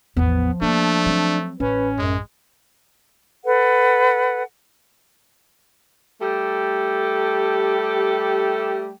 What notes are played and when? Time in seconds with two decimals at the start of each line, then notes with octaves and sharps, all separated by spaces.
0.17 A1 E2 F3 B3
0.62 A3 A#3 D4
1.05 F#3 C4
1.60 A1 C#4 B4
1.98 F#2 G#3
3.45 A4 B4 F#5
6.20 G3 A3 G4 A4